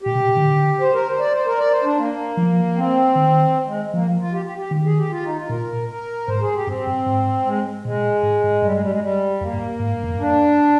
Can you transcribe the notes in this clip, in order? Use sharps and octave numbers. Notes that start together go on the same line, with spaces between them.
A#2 G4
C3
A#2
D#3
D3
C5
A#4
C5
D5
C5
A#4
D5
C5
D4
A#3
F3
C4
D#3
G#3
F3 A#3
F4
G4
G4
G4
D#3
G#4
G4
F4
D#4
F4
A#2 A#4
A#4
G#2 C5
G#4
G4
G2 C4
G2
G#2
G#3
A#2 G#3
G#2
G#2
G2 G3
G#3
G3
G#3
G3
F2 A#3
G2
G#2
G2
F2
G2 D4